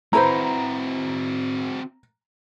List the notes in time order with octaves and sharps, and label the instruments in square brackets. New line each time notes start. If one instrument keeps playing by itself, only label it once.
[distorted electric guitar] C4 F#4 [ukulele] E4 B4 C5 [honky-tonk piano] A#5